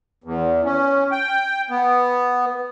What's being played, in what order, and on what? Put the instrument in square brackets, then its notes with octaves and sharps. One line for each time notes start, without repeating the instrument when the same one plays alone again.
[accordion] E2
C#4
G5
B3